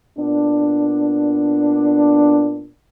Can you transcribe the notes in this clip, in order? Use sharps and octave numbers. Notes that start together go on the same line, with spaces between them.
A#2 B3 D4